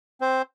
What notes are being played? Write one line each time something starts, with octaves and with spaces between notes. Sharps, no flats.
C4 C5